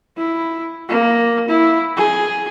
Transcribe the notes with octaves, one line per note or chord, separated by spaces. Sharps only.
E4
A#3
E4
G#4